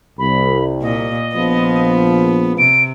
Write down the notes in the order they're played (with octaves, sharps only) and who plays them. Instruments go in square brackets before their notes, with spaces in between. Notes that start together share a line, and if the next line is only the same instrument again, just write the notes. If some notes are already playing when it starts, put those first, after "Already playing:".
[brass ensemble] C2 [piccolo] B5
[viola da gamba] A#2 [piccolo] D#5
[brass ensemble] A#1 F3 [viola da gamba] B3
[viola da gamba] C3 [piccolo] D7